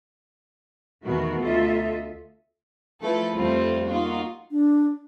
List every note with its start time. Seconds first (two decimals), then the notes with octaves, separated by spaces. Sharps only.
1.04 E2 B2 D#3 A3 F#4 A#4
1.41 D2 F4 A4 D#5 E5
3.02 F3 A3 E4 A4 B4
3.33 F2 G3 A3 C4 F4
3.87 A#3 D#4 F4 F#4
4.51 D4